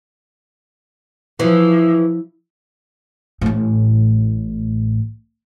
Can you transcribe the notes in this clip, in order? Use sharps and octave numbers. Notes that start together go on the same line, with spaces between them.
E3 F3
A1 A2